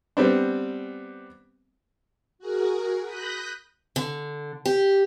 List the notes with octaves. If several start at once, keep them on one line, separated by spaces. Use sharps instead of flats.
G3 B3 C4 D4
F#4 G#4 A#4
B5 D#6 F#6 G6 A#6 B6
D3
G4